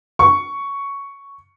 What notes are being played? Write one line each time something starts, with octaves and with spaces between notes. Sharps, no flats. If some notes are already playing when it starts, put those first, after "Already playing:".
C#6